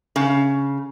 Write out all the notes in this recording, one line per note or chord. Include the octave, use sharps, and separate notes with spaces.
C#3